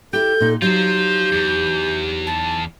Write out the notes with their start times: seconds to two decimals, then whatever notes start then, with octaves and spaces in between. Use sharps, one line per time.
0.13 E4 G4 A4 G6
0.40 A#2 D#4
0.62 F#3 D#4 F4 G4 C5 G6
1.33 E2
2.27 A5